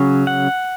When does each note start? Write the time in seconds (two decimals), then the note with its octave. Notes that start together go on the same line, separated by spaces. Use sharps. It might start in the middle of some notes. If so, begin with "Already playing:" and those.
Already playing: C#3 F#3 C#4
0.27 F#5